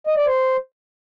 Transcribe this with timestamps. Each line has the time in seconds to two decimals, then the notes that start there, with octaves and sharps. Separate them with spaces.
0.07 D#5
0.17 D5
0.27 C5